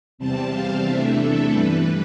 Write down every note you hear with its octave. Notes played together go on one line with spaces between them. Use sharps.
E2 C3 G3 C4 A5
F5
E2 C3 E3 A3 D4 E5
A4
G2 E3 G3 B4